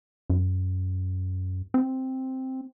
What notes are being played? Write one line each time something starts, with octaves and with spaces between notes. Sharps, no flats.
F#2
C4